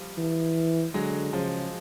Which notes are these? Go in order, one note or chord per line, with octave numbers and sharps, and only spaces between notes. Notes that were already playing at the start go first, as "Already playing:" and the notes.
Already playing: F3 G3
E3
D3 F#3 G#3
C#3 F3